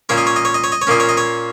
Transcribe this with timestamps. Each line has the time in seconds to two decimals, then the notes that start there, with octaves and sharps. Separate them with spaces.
0.09 A#2 A#3 C#4 C#5
0.18 D#5
0.27 C#5
0.36 D#5
0.45 C#5
0.54 D#5
0.64 C#5
0.72 D#5
0.82 C#5
0.87 A#2 A#3 C#4 D#5
1.00 C#5
1.09 D#5
1.17 C#5